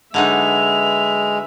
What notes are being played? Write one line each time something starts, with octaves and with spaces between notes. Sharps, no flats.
D3 F#3 G#3 D#4 B4 E5 F7